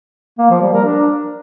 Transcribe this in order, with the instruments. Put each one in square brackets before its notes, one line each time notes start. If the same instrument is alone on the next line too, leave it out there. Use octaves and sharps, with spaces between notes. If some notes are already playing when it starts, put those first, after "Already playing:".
[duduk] A#3
F3
G3
A#4
D4